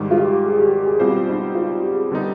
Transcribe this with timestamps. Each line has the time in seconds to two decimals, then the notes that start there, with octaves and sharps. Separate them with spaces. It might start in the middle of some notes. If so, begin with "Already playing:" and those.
Already playing: G#2 D#3 G3
0.11 F4
0.17 G4
0.45 G#4
0.58 G4
0.72 G4
0.86 G#4
1.00 B2 G3 C4 F4 G4 C5
1.28 D#4
1.55 F4
1.83 G4
1.91 G#4
2.00 G4
2.12 D3 G3 B3 D#4